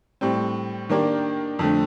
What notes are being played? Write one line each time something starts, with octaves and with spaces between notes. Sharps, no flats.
A2 G3 C4
D#3 A#3 D4 G4 D5
F2 D3 A3